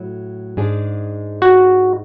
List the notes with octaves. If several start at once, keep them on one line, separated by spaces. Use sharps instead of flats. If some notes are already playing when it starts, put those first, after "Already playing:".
Already playing: A2 F#3 A3
G#2 G#3 D4 G#4
F#4